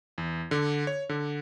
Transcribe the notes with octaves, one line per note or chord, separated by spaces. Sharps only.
E2
D3
C#5
D3